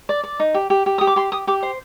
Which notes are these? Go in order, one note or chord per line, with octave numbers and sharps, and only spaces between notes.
D5
D5
D#4
G4
G4
G4
G4 D#6
D6
G4 C6
G4 D#6
G4 D6
C5